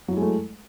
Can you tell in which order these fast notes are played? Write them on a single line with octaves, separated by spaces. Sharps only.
F#3 E4 G#3 A3